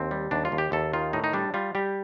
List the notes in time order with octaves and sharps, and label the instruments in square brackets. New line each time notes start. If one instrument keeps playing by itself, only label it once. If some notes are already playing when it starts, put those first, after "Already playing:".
Already playing: [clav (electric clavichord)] D#2 C4
G3
D#2 D4
F4
D#2
G4
D#2 A4
D#3 F4
A2 D#4
D#4
G3 D4
G3 F4
G3 G4